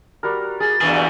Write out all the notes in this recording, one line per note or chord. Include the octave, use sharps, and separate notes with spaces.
G3 F#4 A#4
G#4 A6
E2 G2 B2 E3 G#4